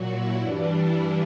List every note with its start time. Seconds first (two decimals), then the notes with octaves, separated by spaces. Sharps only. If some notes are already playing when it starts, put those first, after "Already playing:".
Already playing: A#2 F#3 F#4
0.10 E4
0.40 G2 E3 G3 D4
0.71 E4